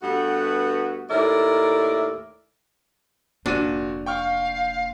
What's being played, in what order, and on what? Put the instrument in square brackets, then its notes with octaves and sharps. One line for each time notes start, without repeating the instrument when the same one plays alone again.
[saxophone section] G2 A3 B3 F#4
D#2 A2 A#4 D5 E5
[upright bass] F1 A#3 [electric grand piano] A#2 F#4 D#7 [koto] D4
[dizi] F5 [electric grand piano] G5 C#6 F6